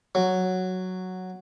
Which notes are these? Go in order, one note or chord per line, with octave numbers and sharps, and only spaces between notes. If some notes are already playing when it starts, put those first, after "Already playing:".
F#3